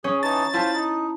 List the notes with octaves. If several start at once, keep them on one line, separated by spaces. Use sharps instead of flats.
C#4 G#4
E3 D#4 A5 A6
E4 F4 C5 A5
D#4